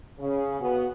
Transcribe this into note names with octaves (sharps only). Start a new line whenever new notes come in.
C#3
B3 F#4